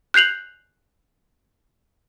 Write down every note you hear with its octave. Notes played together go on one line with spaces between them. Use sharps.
F#6 G6 C7 F7 F#7